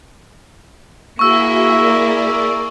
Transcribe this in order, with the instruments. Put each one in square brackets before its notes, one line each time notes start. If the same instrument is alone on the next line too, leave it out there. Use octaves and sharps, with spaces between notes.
[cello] A#3 E4 [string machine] F#4 G#4 E5 [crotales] C#6 E6
[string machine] G#4 A#4 D5